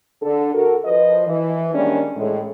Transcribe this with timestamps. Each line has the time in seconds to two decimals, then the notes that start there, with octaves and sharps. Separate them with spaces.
0.22 D3 A4
0.54 F#4 A4 A#4
0.85 F3 B4 D#5
1.27 E3
1.75 D#3 G3 G#3 A#3 C#4 D4
2.16 A2 G#3